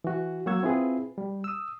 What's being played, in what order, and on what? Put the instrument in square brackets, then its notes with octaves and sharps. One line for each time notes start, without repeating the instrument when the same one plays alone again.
[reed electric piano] E3 F#4
F#3 A#3 F#5 C#6 E6 G#6
C4 E4 F4 G#4 B4
G3
D#6 E6